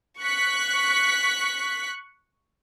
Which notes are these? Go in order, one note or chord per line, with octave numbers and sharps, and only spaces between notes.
C#6 F#6 B6